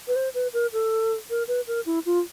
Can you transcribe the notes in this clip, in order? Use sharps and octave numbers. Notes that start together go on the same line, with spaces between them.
B4
C5
B4
A#4
A4
A#4
B4
A#4
E4
F4